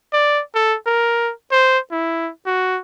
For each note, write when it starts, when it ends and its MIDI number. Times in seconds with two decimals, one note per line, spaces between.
0.13 0.41 74
0.55 0.76 69
0.86 1.32 70
1.51 1.78 72
1.92 2.30 64
2.46 2.80 66